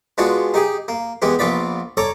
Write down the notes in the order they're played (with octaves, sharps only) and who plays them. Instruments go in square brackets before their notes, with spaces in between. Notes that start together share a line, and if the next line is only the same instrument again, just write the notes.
[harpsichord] G#3 B3 D4 F4 F#4
D#4 G4 G#4
A#3
E2 G#3 B3 G4
A#1 B3 F4 D5 B5
A4 C#5 D5 A5 A#5